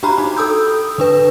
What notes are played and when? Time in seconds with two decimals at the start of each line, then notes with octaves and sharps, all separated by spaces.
0.03 D4 F#4 G4 A#5 B5
0.18 D#4
0.37 A4 D#6 E6 G6
0.98 D3 D4 B4